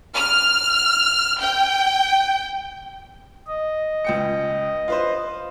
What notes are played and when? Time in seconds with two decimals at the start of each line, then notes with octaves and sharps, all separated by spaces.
0.14 F6
1.40 G5
3.47 D#5
4.05 C#2 G5 C#7
4.88 F4 B4 C5